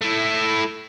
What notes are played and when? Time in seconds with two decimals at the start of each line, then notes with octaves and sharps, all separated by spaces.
0.01 A3 E4